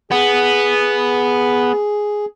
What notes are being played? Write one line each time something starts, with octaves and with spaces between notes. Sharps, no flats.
B3 G#4